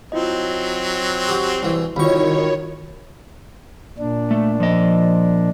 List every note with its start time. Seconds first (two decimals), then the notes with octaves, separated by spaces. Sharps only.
0.12 F#3 C4 E4 F4 D#5
1.28 F#4 G4
1.63 C2 E3
1.96 C2 D#3 F4 F#4 C#5 B5 C#6
3.99 A#2 D4
4.31 A3
4.60 F3 D#5